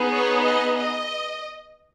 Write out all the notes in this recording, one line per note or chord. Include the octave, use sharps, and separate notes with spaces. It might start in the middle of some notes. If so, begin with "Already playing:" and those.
Already playing: B3 D#4 G#4
C#5
D#5
D#5